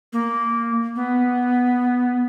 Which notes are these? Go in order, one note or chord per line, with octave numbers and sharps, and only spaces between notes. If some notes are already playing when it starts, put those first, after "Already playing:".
A#3
B3